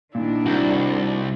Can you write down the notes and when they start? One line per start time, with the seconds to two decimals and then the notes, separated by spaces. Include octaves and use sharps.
0.15 A#2 D#3 D4 E4
0.46 C2 F#4